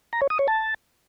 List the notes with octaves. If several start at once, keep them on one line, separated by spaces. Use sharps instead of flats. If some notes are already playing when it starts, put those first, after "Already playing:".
A#5
C#5
D#6
C#5
A5